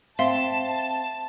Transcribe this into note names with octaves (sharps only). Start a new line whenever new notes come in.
C4 E5 F5 A5 C6